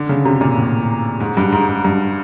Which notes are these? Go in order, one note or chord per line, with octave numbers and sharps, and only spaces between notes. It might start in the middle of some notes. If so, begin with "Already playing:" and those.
Already playing: D3
C#3
C3
A#2
A2
G#2
G2
G#2
G#2
G2